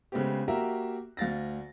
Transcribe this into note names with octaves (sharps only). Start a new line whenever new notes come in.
C#3 G#3 A3 B3 C4 G4
A#3 F#4 G4 E5 A#5
D2 F5 A6 A#6